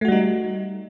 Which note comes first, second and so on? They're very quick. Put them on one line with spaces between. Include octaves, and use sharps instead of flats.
A3 F#4 G3 D#4